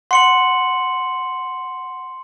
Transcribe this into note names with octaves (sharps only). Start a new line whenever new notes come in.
F#5 C6 C#7 F#7